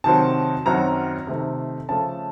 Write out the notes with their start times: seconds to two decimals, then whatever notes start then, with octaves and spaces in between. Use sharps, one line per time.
0.04 C3 D#3 F#3 C4 A5
0.66 F#2 D#3 F#3 C4 A#5
1.27 C3 D#3 A3 C4
1.89 C#3 F3 A3 A5